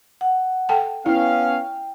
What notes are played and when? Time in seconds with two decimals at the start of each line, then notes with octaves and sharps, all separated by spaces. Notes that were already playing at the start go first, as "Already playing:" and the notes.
0.21 F#5
0.69 A4 G5 A5
1.06 B3 C#4 E4 F5 G5